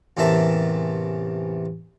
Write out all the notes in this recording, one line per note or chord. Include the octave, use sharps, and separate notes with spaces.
A1 E2 C3 A#4 E5 A5